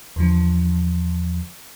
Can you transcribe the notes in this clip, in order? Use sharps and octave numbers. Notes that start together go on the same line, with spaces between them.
E2 D3 F3